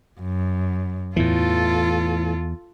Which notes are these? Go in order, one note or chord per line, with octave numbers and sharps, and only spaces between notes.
F#2
E2 A2 E3 F4 A4